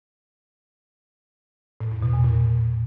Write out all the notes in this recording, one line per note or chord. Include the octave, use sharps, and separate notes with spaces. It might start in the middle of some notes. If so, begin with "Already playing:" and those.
A2
E2
B2
E2
A#2